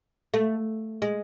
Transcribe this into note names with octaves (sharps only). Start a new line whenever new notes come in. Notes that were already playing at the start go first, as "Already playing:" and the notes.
A3
G#3